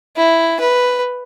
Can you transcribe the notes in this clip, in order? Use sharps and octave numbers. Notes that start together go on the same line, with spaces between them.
E4
B4